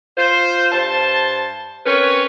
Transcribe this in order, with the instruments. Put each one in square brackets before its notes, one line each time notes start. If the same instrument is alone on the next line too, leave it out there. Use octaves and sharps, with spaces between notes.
[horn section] F4 C5
G2 C5 A5
C4 C#4 A#4 B4 C#5